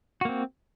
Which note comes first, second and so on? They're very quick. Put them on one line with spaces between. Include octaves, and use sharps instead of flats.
F#4 A#3 C4